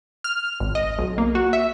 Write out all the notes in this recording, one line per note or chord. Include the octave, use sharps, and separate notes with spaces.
F6
G#1
D#5
B1
A#3
F#4
E5